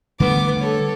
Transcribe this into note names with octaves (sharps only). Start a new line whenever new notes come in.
D3 G3 A3 B3 D6
A4 C#5